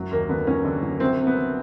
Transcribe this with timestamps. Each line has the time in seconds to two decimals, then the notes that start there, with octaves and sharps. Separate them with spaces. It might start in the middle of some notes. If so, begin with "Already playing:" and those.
Already playing: F#1 F#3
0.11 D#2 A#3
0.29 D3 B3
0.47 F#3 C#4
0.65 D3
0.83 F#3
1.00 C2 C4
1.19 C3
1.27 B3
1.36 C2